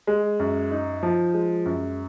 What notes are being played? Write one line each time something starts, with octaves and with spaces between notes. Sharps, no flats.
G#3
F#2
D#4
F3
G#3
F#2